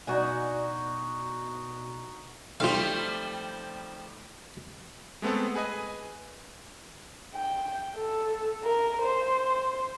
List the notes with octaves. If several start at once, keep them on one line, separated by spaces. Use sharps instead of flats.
B2 D4 D#4 F#4 D5 D#5 G#5
F3 G3 A3 C4 D#4 F4 F5
G#3 A3 B3 C4 A4
G#4 B4 D#5 G#5
G5
A4
A#4
C5